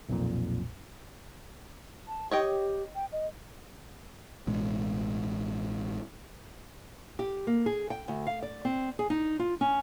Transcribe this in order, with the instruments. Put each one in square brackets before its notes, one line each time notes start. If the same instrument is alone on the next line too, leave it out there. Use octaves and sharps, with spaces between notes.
[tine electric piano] B1 F2 A#2
[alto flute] A5
[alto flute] G4 [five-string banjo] C#5 D#5 G5
[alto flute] G5
D#5
[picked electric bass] A1 B2 G#3
[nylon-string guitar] G4
A#3
G#4
G5
D2
F5
D5
C4
G#4
D#4
F4
C#4